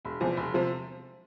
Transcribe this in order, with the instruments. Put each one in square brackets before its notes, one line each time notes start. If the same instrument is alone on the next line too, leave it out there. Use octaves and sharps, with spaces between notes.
[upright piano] E1
E2 C3 F3
E1
C3 F3